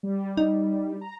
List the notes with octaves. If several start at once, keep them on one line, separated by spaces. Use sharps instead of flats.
G3
D#4
A#5